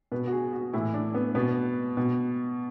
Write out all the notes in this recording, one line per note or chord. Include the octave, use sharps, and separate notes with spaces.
B2 B4
F#4
G#4
F#4
A2 E3 E4
D4
B3
B2 B3
B2